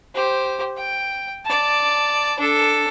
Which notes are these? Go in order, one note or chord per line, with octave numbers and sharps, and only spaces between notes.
G4 C5
G5
D5 A5
D4 A4